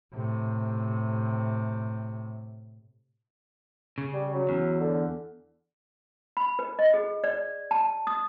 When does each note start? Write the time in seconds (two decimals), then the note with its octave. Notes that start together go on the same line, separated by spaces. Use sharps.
0.15 A2 C3
3.98 C#3
4.13 G3
4.34 F#3
4.49 E2
4.80 D3
6.37 B5
6.59 B4
6.79 D#5
6.94 G#4
7.24 D5
7.71 A5
8.07 D#6